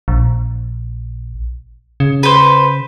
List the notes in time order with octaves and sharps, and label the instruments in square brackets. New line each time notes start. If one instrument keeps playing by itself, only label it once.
[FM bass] A#1
C#3
[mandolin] B4 C5